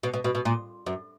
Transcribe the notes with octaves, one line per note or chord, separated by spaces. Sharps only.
B2
B2
B2
B2
A#2
F#2